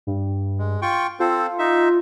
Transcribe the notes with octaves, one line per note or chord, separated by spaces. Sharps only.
G2
G#3
F4 G5 C#6
C4 F4 A4 C5
D#4 E5